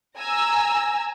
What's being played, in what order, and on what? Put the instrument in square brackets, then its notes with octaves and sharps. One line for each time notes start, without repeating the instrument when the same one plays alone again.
[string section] G#5 A#5 E6